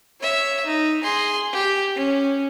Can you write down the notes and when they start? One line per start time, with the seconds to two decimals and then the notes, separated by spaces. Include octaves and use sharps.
0.20 C#5 E5
0.66 D#4
1.03 G#4 C6
1.53 G4
1.96 C#4